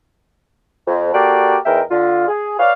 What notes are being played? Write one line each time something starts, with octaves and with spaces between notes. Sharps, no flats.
F2
A#3 F#4 G4 A4 D5
E2 D#4 A#4 E5 G5
D3 F4
G#4
B4 C#5 D5 F5